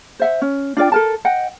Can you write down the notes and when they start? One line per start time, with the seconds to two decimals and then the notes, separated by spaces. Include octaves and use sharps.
0.20 C5 E5 F#5
0.42 C#4
0.77 D4 F4 D5 G5
0.92 A4 A#4 A5
1.25 D#5 F#5 G5